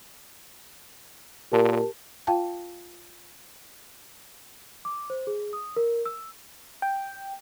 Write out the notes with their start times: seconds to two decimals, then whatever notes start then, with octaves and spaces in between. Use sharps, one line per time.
1.52 A#2 G4 A#4 A5
2.27 F4 F5 G5 A5
4.85 D6
5.10 C5
5.27 G#4
5.53 D#6
5.76 A#4
6.06 E6
6.82 G5